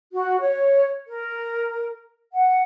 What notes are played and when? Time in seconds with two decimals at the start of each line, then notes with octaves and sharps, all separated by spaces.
0.12 F#4
0.39 C#5
1.07 A#4
2.32 F#5